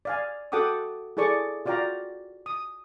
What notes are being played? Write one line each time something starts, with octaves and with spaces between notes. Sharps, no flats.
D5 F5 G#5
F#4 A4 F#5 G5 D6 D#6
E4 G#4 A4 D5 C#6 D6
F4 F#4 D5 F5 G5 A#5
D#6